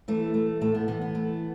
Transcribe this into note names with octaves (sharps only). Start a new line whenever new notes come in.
E3 A3
A3
A2 A3
B3
E3 B3
B3
A3